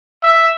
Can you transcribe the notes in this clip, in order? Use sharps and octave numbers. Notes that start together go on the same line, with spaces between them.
E5